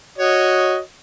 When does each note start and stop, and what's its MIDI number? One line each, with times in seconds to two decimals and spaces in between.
0.18 0.78 66
0.18 0.78 73
0.18 0.78 75